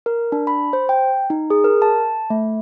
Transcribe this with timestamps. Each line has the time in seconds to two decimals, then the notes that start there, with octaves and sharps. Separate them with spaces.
0.06 A#4
0.32 D4
0.47 B5
0.73 C5
0.89 G5
1.30 D#4
1.50 G#4
1.64 A#4
1.82 A5
2.30 A3